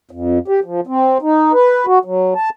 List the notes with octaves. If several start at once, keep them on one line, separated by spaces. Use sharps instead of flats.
F2
G4
F3
C4
D#4
B4
F#4
F#3
A5